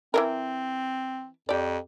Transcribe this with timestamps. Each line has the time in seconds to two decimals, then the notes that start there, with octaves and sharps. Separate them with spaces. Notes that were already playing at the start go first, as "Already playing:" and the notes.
0.14 E3 F#3 C4 A#4
1.49 F2 G4 D5